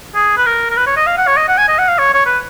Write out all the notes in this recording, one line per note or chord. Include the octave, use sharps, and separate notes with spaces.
G#4
B4
A#4
A#4
B4
C#5
D#5
F5
F#5
C#5
D#5
F#5
G#5
D#5
F#5
F5
C#5
C#5
B4